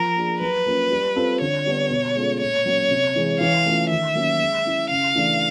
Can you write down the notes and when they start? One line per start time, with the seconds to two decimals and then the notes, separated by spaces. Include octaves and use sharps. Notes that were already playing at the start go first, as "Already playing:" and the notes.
Already playing: F3 A#4
0.16 A#3 D4 F4 G#4
0.40 F#3 B4
0.66 A#3 C#4 F4
0.90 G3
1.16 C4 F4 A4
1.41 D3 C#5
1.66 G3 B3 D4
1.90 B2
2.16 G#3 C#4 F4 A4
2.41 A#2 C#5
2.66 F#3 A#3 C#4
2.91 C3
3.16 E3 G#3
3.40 E3 F5
3.65 A3 C#4 F4 A4
3.90 D#3 E5
4.15 F#3 A#3 C#4
4.41 G#3
4.65 C#4 E4
4.90 C#3 F5
5.15 E3 A3 D4